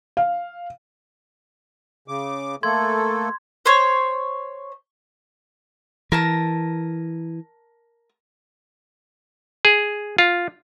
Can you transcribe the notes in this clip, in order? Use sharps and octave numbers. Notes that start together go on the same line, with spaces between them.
F5
C#3 D6
A3 A#3 A4 C6 G#6
C5 C#5
E3 A#4 A5 A#5
G#4
F4